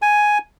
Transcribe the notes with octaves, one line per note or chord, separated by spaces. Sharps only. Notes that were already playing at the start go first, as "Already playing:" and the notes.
G#5